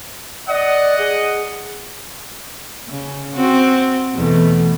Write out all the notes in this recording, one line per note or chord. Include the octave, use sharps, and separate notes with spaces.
D5 D#5 F#5
G#4
C#3
C4 F#4
E2 B2 A3